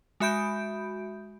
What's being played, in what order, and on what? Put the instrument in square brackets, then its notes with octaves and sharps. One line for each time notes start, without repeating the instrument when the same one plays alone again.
[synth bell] G#3 F#4 E5 B5 G6 D7